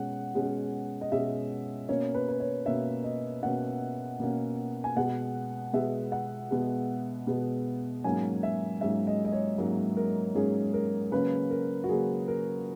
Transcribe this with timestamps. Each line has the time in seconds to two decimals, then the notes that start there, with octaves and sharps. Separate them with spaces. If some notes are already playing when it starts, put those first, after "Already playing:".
Already playing: B2 G#3 C#4 F#5
0.35 B2 G#3 C#4
1.01 D#5
1.12 B2 G#3 C#4 E5
1.89 B2 A#3 C#4 C#5
2.14 B4
2.29 B4
2.40 C#5
2.66 B2 A#3 C#4 E5
3.04 D#5
3.42 B2 A#3 C#4 F#5
4.20 B2 A#3 C#4
4.84 G#5
4.96 B2 G#3 B3 F#5
5.73 B2 G#3 B3 E5
6.12 F#5
6.51 B2 G#3 B3
7.27 B2 G#3 B3
8.04 G#2 F#3 A#3 C#4 G#5
8.43 E5
8.81 G#2 F#3 A#3 C#4 E5
9.07 D#5
9.25 D#5
9.32 C#5
9.58 G#2 F#3 A#3 C#4 A#4
9.97 A#4
10.35 G#2 F#3 A#3 C#4 G#4
10.74 A#4
11.12 C#3 F#3 A#3 C#4 B4
11.50 A#4
11.84 F#4
11.89 C#3 F#3 A#3 C#4 G#4
12.28 A#4